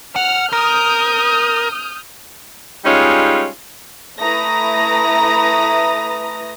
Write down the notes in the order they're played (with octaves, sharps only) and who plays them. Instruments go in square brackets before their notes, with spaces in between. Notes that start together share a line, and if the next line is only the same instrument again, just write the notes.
[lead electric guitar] F#5 [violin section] F6
[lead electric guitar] A#4 [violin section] D#6 F6 G6
[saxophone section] G3 G#3 C#4 D#4 F4
[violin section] A3 E4 B4 A#5 D#6 A#6